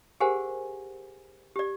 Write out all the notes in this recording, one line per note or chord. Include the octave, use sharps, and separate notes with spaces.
G4 G#4 A#4 C5 F#5 G#5
G4 D5